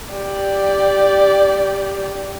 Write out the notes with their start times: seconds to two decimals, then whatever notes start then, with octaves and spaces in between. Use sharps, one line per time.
0.13 G4 D5